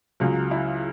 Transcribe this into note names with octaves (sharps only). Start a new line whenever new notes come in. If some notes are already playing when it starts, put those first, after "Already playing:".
C#2 C#3 F#3
E4